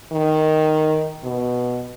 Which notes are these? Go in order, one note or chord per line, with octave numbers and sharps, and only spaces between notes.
D#3
B2